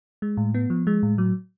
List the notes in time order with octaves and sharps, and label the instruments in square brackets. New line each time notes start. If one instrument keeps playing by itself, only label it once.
[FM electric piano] G#3
A2
B3
F3
G#3
A2
F#3